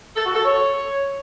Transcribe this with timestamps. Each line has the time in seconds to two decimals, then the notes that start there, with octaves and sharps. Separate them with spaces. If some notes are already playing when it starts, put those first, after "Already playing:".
0.16 A4
0.26 F#4
0.35 A4
0.44 C#5